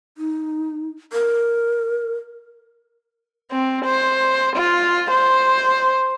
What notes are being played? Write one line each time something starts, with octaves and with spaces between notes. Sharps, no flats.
D#4
A#4
C4
C5
F4
C5